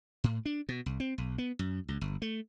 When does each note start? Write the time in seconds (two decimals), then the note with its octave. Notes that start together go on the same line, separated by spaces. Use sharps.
0.24 A2
0.46 D4
0.69 B2
0.86 C2
1.00 C4
1.18 B1
1.38 B3
1.59 F#2
1.88 C#2
2.01 G1
2.22 A3